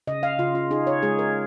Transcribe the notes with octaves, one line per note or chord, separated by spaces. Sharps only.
C#3 D#5
F5
C#3 F4
F4
D#4 G#4
C#5
G#3 G#4
A#4